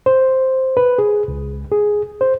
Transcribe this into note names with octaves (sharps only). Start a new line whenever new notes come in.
C5
B4
G#4
C#2
G#4
C5